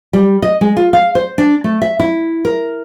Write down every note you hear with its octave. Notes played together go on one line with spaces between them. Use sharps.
G3
D#5
G#3
F4
F5
C5
D4
A3
E5
E4
A#4